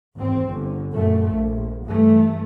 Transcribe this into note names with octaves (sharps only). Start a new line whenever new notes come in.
G#1 E2 C4
G1 D3
F#2 A#2 A3
A#1
G2 E3 A3